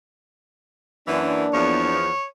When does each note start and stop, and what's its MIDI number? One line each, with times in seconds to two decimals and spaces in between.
1.08 1.45 42
1.08 1.45 52
1.08 1.98 58
1.08 1.98 62
1.53 2.08 40
1.53 2.08 53
1.53 2.25 73